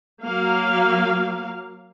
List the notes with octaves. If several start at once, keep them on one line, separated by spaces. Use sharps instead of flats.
F#3 A#3 F5